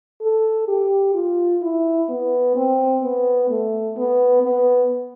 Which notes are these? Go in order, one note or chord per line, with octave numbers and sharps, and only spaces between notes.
A4
G4
F4
E4
B3
C4
B3
A3
B3
B3